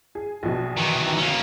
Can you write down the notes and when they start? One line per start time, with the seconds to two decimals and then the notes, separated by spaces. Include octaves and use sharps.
0.15 G#4
0.43 A#1 B2
0.77 D#3 E3
1.17 A#3 C#4